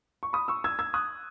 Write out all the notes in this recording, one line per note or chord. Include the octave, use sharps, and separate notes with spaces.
C#6
B5 D#6
C#6 E6
E6 G#6
E6 G#6
D#6 F#6